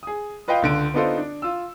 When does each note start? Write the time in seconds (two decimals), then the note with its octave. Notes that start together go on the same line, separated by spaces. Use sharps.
0.03 G#4 D#6
0.48 F4 B4 D#5 F5 G5
0.62 C#2 D3 D7
0.94 B3 D4 D#4 F4 A4 C5
1.18 D4
1.42 F4 E6